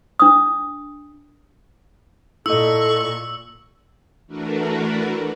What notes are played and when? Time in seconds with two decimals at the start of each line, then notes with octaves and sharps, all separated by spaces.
0.19 D4 D#6
2.46 A#2 E4 A4 D#5 C#6 E6
4.27 E3 A3 D4 F#4 A#4 B4